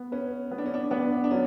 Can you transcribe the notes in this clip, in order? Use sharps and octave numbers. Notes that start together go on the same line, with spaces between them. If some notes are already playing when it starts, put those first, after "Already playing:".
Already playing: B3
C#4 B4
B3
D4
C#4
D4
B3 D4
D4
F#3 C#4